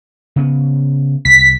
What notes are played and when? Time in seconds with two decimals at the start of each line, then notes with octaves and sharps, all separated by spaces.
0.36 C#3 B3
1.25 C2 B6